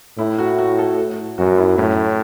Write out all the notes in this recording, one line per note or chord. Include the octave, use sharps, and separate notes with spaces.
A2 E4
F#4
F#4
A4
F#2 F#4
E4
A2 C#4